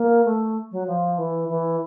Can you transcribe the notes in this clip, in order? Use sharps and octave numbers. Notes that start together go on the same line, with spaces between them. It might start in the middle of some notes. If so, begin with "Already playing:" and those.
Already playing: A#3
A3
F#3
F3
E3
E3